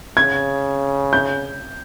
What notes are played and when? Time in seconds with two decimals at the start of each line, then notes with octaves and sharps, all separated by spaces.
0.17 C#3 G#6
1.13 G6